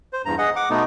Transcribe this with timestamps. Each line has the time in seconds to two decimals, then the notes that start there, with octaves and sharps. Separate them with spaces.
0.13 C5
0.25 E2 G2 A#5
0.38 G#4 D#5 F#5
0.56 F#5 D6
0.70 B2 A3 B3 D#4